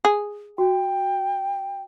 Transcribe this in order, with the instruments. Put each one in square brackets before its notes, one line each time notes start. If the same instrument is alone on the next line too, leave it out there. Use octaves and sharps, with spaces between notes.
[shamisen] G#4
[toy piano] F#4 [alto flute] G5